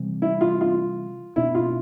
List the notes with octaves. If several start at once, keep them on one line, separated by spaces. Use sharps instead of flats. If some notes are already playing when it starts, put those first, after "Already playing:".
Already playing: C3 E3 G3 C4
E4
F4
F4
B2 B3 D4 E4
F4